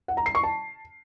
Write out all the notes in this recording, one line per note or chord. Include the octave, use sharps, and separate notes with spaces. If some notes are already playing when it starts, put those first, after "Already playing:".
F#5
A#5
C7
C#6
A5